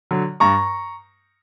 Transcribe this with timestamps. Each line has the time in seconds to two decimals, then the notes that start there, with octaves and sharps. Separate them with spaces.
0.11 D3 F#3
0.40 G2 A#5 C#6